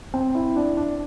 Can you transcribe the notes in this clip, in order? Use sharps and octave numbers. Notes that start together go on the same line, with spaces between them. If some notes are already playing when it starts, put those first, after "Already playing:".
C4
E4
D4
D4